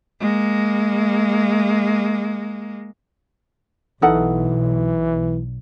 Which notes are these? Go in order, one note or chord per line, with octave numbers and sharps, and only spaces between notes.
G#3 A#3
B1 E3 D#4 A4 F#5